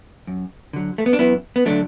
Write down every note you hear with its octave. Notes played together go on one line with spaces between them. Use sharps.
F#2
D3 F#3
A3
B3
D4
F#2 B3 E4
B3
D3 F#3 A3 D4